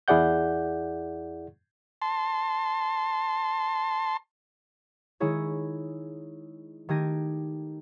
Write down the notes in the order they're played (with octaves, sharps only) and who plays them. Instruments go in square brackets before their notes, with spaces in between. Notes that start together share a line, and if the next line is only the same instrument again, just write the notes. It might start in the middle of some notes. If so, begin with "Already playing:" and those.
[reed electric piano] E2 E4 G#4 D5 F#5 G6
[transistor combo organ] A5 C6
[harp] D#3 G#3 E4 G#4 C#5
D#3 A3 G4 G#6 A#6 D#7